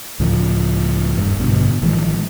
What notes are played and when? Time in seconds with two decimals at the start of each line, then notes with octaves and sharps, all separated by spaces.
0.20 C#2 A2 F3
1.18 D#1 G2
1.39 A1 G2 B2 D3
1.82 A1 D#3 F3 G#3